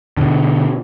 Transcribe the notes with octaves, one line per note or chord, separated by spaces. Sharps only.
B2 D3